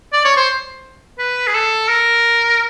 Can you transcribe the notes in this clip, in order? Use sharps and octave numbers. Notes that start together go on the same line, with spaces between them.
D5
C#5
C5
B4
G#4
A4
A#4